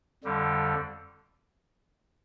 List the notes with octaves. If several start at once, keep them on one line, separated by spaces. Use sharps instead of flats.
F2 D3 G3